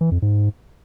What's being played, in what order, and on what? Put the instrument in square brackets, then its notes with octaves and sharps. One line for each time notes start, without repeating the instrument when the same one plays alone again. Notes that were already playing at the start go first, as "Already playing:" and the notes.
[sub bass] E3
F2
G#2